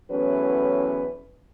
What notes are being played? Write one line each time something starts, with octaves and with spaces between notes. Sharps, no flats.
E2 A2 F#3 C#4 B4